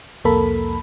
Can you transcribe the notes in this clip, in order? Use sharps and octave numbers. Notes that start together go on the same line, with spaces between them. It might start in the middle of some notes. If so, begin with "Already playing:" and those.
C2 F2 A#3 A4 A#4 B5